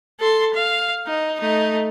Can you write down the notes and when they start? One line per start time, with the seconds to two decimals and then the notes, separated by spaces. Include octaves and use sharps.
0.20 A4 C6
0.54 F5
1.07 D#4
1.40 A3 D#4